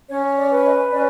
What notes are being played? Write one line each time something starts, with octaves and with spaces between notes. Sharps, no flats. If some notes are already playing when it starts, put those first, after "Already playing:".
C#4 C#5
D5
B4
D#5
C#4 D5